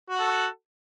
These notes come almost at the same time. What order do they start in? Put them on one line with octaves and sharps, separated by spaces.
F#4 F#5 A4